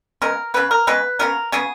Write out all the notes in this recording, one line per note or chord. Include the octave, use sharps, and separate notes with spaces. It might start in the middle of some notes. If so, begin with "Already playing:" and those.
C#3 G#3 B3 A#4
C#3 G#3 B3 B4
A#4
C#3 G#3 B3 B4
C#3 G#3 B3 A#4
C#3 F#3 B3 G#4